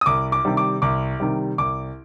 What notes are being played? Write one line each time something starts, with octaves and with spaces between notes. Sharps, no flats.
D#6
C2 D6
D6
C3 D#3 G3
D6
C2 D6
C3 D#3 G3
C2 D6